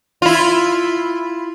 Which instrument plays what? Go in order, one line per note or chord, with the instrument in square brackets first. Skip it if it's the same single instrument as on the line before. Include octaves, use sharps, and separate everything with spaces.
[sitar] E4 F4